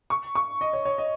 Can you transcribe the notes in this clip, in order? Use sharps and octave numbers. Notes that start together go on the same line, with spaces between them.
C#6
C#6
D#5
C#5
C#5
D#5